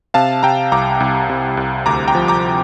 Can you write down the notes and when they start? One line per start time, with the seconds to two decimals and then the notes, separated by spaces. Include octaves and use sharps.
0.14 C3 F5 A5
0.43 C3 G5 A#5
0.72 C2 A#5 D6
1.00 C2
1.29 C3
1.57 C2
1.86 D2 A#5 D6
2.08 G5 A#5
2.15 F3
2.28 A#5 D6